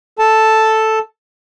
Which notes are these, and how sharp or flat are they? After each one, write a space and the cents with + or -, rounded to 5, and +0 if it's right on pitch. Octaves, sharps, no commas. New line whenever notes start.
A4 +0 A5 +0